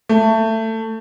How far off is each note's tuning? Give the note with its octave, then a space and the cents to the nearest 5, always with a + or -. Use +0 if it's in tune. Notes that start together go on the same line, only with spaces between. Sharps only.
A3 +20